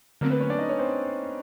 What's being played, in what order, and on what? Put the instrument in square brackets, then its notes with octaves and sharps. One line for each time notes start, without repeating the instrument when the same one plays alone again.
[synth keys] D3 F#3 A3 C4 [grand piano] A#3 A#4
[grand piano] B3 B4
C#4 C#5
D4 D5
D#4 D#5
C#4 C#5
C4 C5